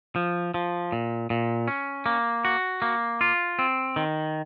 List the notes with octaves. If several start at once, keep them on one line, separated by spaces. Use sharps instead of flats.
F3
F3
A#2
A#2
C#4
A#3
F#4
A#3
F4
C4
D#3